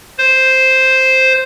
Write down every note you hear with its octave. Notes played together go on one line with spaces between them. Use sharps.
C5